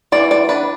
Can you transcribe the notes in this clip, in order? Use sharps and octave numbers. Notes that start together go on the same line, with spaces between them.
E3 D5
D5
D4 B4